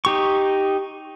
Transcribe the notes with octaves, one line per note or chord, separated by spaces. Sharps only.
D#4 G4 C#6